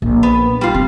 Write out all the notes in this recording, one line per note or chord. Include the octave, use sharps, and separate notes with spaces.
A#1
B3
G3 F4
G2 C4